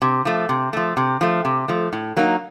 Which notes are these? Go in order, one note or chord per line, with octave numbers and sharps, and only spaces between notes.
C3
F3 A3
C3
F3 A3
C3
F3 A3
C3
F3 A3
A2
F#3 A#3 D#4